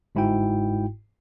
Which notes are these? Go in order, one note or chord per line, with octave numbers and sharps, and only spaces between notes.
G1 G#2 E4 F#4 G5